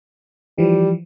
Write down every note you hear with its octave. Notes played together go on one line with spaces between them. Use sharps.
E3 F3 G3